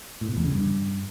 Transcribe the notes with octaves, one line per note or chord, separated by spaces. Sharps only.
A2
B2
E2
C#3
G2